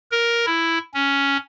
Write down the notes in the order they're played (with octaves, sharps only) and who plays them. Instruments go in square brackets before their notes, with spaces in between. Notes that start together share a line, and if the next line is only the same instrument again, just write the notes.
[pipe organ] A#4
E4
C#4